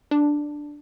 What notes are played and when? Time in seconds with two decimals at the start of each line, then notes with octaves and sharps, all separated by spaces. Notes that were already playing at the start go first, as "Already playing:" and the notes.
0.11 D4